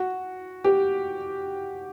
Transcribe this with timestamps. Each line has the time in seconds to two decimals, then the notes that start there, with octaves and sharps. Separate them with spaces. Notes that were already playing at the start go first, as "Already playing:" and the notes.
Already playing: F#4
0.64 G4